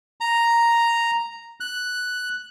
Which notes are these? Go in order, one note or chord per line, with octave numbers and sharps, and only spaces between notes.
A#5
F#6